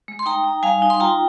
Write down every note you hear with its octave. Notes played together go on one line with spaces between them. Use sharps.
G#3
C6
D#4 G5 A#5
D#4
G3 F5 G#5
D#4
C6
F4 G5 A#5